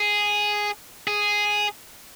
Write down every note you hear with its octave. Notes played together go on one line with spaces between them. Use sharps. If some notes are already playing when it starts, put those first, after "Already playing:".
Already playing: G#4
G#4